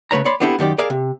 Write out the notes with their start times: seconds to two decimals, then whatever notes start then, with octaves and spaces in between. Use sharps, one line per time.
0.11 C#3 A3 B4 C#5 A#5
0.25 C#5 D5 B5 C6
0.40 B3 C4 D4 E4 G4 A4
0.59 F#2 D#3 G4 D5
0.78 G#4 A#4 D5 E5 F5
0.90 C3